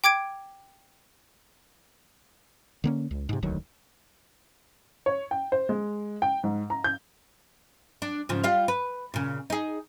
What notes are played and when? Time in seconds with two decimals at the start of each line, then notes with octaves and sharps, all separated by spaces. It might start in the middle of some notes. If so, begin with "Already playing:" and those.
0.04 G5 D6 G#6 D7
2.84 D3 A#3 C#4
3.11 C#2
3.29 G#2 C3
3.43 E1 D2 D#3 F#3
5.06 C#5
5.31 G5
5.52 C5
5.69 G#3
6.22 G5
6.44 G#2
6.70 A#5
6.84 G6
8.02 D4
8.29 G#2 C#3 F3
8.44 G3 F4 F5
8.68 B4
9.14 A#2 C#3
9.50 D#4 G#4